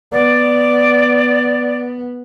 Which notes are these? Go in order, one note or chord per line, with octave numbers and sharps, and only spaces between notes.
B3 D5